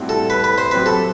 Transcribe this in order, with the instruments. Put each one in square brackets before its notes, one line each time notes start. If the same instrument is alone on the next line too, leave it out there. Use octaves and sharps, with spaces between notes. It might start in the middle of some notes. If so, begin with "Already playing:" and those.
Already playing: [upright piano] A2 G3 C4 F#4
[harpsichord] A4
B4
B4
C5
[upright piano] F#3 C4 G4 [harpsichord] B4
[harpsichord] A4